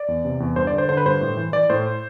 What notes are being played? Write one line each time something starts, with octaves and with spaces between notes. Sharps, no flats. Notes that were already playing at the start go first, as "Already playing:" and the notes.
Already playing: D5
E2
C3
E2
G2 C5
D5
D3
C5
D3 C5
B4
G2 C5
A2
E3
E3 D5
A2 C5